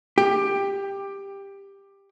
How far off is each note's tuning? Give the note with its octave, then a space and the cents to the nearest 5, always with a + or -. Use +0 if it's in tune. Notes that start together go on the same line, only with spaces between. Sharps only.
G4 +15